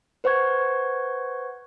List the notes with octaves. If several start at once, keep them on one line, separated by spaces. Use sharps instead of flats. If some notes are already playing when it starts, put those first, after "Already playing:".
B4 C5 F#5 C#6 G#6